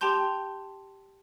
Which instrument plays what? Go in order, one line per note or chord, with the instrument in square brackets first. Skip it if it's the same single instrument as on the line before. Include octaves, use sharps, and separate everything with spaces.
[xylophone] G4 G5 A5 C6 G6